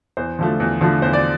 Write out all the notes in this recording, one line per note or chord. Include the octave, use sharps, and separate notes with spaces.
E2 C5
D3 F3 A3
E2
D3 F3 A3
E2 C5
D5